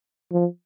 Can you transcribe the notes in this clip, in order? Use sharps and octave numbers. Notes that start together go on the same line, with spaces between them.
F3